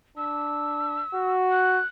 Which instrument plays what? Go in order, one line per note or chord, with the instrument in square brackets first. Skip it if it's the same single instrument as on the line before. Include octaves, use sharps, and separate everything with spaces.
[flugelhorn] D4 [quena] E6
[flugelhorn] F#4
[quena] F#6